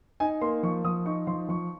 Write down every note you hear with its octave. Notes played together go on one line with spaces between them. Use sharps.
D#4 G#5
A#3 C6
F3 C#6
F3 D#6
D#4 C#6
F3 C6
F3 C#6